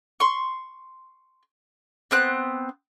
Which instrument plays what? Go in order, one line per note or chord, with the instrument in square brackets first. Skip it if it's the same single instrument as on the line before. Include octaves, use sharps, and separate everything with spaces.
[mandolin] C6 C#6
B3 C4 F#6